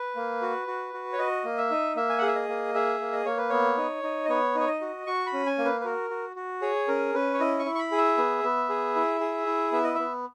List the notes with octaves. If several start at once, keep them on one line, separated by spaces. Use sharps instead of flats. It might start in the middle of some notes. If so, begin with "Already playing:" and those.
Already playing: B4
A#3
F#4
F#4
F#4
C#5
F#4 D#5
A#3
E5
D#4
A#3 E5
G#5
F#5
G#4 E5
D#5
A#3
G#4 E5
A#3
D#5
A#3 C#5
B4
B3 C#5
D#4
D#4
D#5
B3 C#5
D#4 C#5
D#5
F#4
F#4 C#6
B5
C#4
G#5
A#3
B4
B4
F#4 A#4
F#4
F#4
G#4 C#5
C#4 A#4
C#4 B4
C#5
E4 D#5
C#6
E4
C#6
B5
G#4
E5
B3
B3
G#4
E4
G#4
E4
B3 E5
D#5
B3 E5